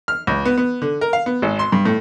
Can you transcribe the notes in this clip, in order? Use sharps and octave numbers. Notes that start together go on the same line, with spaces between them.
F6
C#2
B3
B3
D3
A#4
F5
B3
G#1
C6
G2
A2